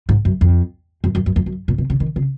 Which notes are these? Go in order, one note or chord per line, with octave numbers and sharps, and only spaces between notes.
G#2
F#2
F2
F#2
F#2
F#2
F2
F#2
A#2
B2
C#3
D#3
C#3